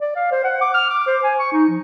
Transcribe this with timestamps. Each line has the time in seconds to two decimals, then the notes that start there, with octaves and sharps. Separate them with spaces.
0.01 D5
0.16 F5
0.32 C5
0.44 F#5
0.61 D6
0.74 F6
0.90 D6
1.07 C5
1.24 G#5
1.39 C#6
1.53 D#4
1.69 F3